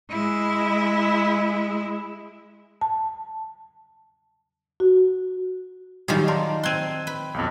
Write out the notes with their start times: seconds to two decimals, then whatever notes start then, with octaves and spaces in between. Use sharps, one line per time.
0.11 G#3 E4
2.81 A5
4.80 F#4
6.08 D#3 F#3 G3 D#4 F4 G#4
6.28 A#4 D5 A5 C6
6.63 C4 C6 F#6 G#6 D#7
7.07 B4
7.34 B1 F2